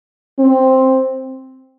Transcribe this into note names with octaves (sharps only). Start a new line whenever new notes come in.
C4